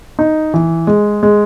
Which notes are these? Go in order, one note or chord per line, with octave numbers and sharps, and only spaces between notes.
D#4
E3
G#3
G#3